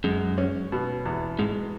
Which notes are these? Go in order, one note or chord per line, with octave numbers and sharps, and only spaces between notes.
F#2 G#3
C#4
B2
E2
G#2 G#3